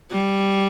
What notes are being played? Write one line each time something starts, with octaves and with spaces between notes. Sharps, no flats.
G3